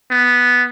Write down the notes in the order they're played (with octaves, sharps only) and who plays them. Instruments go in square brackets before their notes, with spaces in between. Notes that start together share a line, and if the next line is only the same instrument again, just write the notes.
[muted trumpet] B3